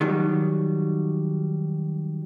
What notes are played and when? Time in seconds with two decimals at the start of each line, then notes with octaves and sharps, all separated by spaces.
0.01 D#3 F#3 G3